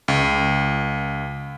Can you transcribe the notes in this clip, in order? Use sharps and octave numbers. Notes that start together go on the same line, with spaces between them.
C#2